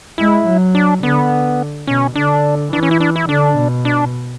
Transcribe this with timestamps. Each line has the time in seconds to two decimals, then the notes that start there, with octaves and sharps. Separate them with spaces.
0.18 G#3 E4
0.47 F#3
0.75 D4
1.03 D3 B3
1.87 B2 C#4
2.16 D3 D4
2.73 E3 D4
2.83 C#4
2.91 E4
3.00 D4
3.16 E4
3.29 D3 D4
3.57 B2
3.85 D4